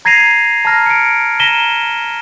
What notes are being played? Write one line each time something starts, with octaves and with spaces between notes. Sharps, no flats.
A#5 G#6 A#6 C7 D#7 F7
A5 A#5 F6 A#6
C#7 D7
A#5 A#6 B6 D#7 E7 G7